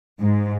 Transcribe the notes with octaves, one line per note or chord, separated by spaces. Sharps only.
G#2